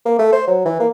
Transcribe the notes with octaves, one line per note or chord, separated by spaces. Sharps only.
A#3
A3
C5
F#3
E3
A#3